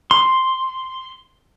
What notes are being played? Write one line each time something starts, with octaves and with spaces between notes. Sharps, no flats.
C6